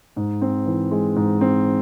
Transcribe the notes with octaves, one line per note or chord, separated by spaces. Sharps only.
G#2
C4
E3
G#3
G#2
C4